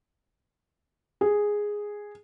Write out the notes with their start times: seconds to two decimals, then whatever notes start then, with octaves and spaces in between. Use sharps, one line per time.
1.21 G#4